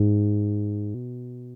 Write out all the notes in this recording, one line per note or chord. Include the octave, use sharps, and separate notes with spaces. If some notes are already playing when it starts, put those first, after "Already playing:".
Already playing: G#2
B2